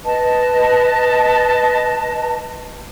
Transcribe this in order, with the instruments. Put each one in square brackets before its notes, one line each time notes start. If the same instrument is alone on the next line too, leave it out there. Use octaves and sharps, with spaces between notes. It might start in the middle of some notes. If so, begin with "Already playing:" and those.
[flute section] B4 D#5 A5